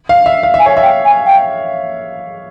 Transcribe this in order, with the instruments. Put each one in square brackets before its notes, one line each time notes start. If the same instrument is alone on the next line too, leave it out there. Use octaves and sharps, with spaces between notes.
[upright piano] F5
E5
F5
E5
[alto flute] G#5
[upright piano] C#5
E5
[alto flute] G5
G#5
G5